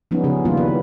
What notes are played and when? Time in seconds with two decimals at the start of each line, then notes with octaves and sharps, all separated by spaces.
0.11 F3 G3 B3 C#4 D#4
0.24 C#3 C#4 G#4
0.45 D#3 G3 A#3 B3 E4 F4
0.57 B4